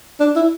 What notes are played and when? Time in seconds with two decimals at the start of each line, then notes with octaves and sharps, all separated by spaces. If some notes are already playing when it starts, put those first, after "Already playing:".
0.20 D4
0.36 E4